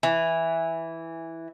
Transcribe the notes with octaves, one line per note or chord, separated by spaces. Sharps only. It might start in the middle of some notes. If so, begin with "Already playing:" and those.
E3